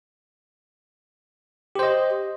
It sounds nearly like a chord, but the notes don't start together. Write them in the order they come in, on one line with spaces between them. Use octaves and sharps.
G4 C5 D#5